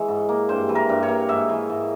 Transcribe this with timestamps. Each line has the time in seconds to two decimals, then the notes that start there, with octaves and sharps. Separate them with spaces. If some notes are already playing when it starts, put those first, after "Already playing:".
Already playing: E3 G#3 C#5 E5
0.08 G#2
0.29 A#3
0.49 G2 C5
0.69 E3
0.75 A#4
0.89 G2
1.03 C#5
1.09 A#3
1.29 G#2 E5
1.49 E3
1.70 G#2